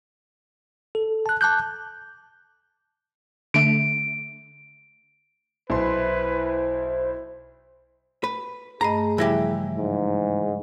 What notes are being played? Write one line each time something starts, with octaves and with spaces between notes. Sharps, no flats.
A4
A5 F#6
A5 D6 F#6 G6
D3 A3 D7
B1 E4 B4 C5 C6
B4
G2 A3 G#4 D#5 A#5
C#3 E3 F3 G3 E4 G4
G#2